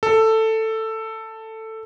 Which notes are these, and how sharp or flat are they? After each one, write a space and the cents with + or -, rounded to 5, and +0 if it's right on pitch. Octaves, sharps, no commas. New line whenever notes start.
A4 +10